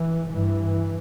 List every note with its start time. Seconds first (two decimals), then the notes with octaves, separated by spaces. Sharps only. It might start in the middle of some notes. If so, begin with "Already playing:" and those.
Already playing: E3
0.32 G2 E3